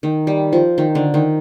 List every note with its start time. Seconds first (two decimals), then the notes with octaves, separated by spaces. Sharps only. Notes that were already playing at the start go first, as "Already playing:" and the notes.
0.03 D#3
0.27 G3
0.53 F3
0.78 D#3
0.95 D3
1.14 D#3